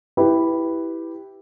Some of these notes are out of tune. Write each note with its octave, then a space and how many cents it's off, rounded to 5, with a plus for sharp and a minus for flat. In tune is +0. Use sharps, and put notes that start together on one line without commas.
E4 +0 G4 +0 B4 +0